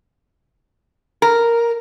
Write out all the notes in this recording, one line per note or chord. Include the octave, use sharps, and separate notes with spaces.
A#4